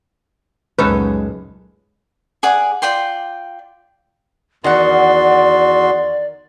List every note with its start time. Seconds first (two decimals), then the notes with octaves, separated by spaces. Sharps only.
0.79 C#2 F#2 A#2 G#3 C#4 D#4 A4 B4
2.43 G#4 D5 F#5
2.82 F4 D5 G5 C6
4.64 E2 D#3 F#4 D5 F#5 C6